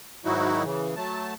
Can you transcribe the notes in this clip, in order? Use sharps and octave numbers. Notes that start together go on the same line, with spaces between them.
G#2 D#3 F#3 D#4 E4 F#4
C#3 E3
F#3 A3 A5